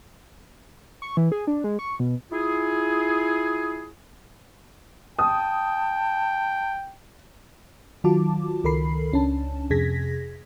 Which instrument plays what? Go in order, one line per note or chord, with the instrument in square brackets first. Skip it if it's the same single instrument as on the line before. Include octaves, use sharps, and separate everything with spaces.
[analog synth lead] C#6
E3
G#4
D4
G#3
C#6
B2
[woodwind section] E4 F4 G#4
[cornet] G5 [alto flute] A5 [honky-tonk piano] D#6
[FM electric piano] D#3 F#3 F4 F#4 A5 D6
C#2 D#3 A4 A#4 B5 C7
C#2 C#4 D4 A5
F2 C3 G#4 G#6 A#6 B6